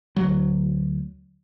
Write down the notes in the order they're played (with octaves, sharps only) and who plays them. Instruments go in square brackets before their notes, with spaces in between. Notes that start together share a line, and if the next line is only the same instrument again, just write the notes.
[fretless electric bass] D2 F#3